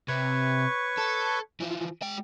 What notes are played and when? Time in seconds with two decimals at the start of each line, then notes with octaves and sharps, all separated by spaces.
0.08 C3 B4 C#5 C#6
0.97 A4
1.60 E3 F3
2.02 G#3 G5